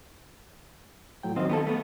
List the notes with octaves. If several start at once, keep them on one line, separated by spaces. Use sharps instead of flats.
A2 F#3 G5
F#2 D#3 C4 D#5 F5
B3 G4 A4
A3 B3